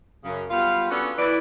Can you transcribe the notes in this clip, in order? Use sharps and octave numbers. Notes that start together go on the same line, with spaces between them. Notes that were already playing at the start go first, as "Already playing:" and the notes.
F#2 C#3
G3 B3 F4 F5
B3 C#4 D4 F#4 G#4 A4
E3 B4 D5